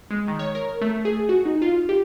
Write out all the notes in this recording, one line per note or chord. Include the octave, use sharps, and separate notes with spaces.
G#3
D#3
C#5
A#4
A3
G#4
F#4
D#4
F4
G4